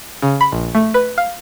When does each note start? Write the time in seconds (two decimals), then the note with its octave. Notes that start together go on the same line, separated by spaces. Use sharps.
0.22 C#3
0.41 B5
0.52 A#1
0.75 A3
0.94 B4
1.18 F5